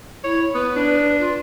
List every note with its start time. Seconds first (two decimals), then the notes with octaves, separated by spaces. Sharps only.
0.24 E4 C#5
0.55 B3 B4
0.76 D4
1.19 F4